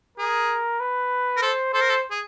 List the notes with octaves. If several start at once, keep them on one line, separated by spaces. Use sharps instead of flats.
G#4 A#4
B4
A#4
A4 C5
A4 C5
A#4
A4
G#4